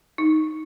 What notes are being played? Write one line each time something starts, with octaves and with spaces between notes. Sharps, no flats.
D#4